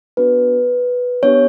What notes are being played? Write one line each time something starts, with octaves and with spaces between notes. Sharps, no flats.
B3 D4 F#4 B4
B3 D4 G4 C#5